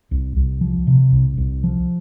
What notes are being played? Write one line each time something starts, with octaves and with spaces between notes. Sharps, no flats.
C2
C2
F3
C3
C2
C2
F3